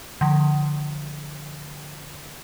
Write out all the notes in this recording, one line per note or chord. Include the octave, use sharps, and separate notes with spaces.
D3 F3